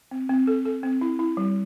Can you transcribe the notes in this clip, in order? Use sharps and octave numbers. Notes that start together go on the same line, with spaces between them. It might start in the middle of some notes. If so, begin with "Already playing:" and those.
C4
C4
A4
A4
C4
E4
E4
G3